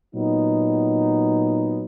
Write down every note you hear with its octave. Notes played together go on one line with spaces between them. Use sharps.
A#2 F#3 B3 D#4